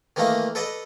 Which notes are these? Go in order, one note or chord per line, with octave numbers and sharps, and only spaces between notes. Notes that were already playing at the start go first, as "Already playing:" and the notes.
D#3 E3 A3 A#3 D#4
A4 B4 D5 D#5